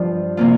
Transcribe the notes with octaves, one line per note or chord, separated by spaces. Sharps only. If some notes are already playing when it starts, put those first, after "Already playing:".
Already playing: G2 F3 D4 F4
C3 A#3 F4